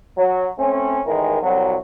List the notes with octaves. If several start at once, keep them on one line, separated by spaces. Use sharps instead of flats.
F#3
A3 C4 C#4
A1 D#3 E3 G#3 A#4
C2 F#3